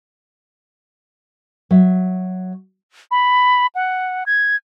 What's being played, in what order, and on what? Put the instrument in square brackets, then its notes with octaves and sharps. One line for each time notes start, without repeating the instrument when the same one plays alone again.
[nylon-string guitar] F#3 E5
[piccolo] B5
F#5
G#6